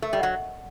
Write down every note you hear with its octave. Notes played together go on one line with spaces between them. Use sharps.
A3 A#4
G3
F#3 D#5 F#5